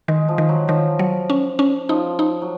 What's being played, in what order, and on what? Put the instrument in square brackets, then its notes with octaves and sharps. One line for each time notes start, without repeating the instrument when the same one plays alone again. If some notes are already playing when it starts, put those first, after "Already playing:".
[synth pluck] D#3 [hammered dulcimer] G#3
[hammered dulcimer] F3
[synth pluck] D#3
[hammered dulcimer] F#3
[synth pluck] D#3 [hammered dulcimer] F3
[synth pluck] F#3
C#4
C#4
[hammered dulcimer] F3 [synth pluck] D#4
[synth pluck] D#4
[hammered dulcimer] F#3